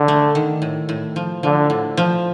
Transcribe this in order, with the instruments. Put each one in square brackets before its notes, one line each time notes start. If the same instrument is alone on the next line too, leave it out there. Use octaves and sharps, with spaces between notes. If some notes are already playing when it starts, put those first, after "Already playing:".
Already playing: [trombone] D3
[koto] A3
D#3
A2
A2
F3
[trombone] D3 [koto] F3
[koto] A2
F3